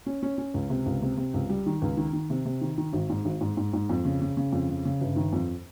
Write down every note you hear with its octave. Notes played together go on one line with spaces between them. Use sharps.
C#4
C#4
C#4
C#2
C3
C#2
C3
C3
C#2
G3
D#3
C#2
D#3
D#3
C3
C3
D#3
D#3
G#1
G#2
G#1
G#2
G#2
G#2
F2
C#3
C#3
C#3
F2
C#3
C#3
G1
D#3
F2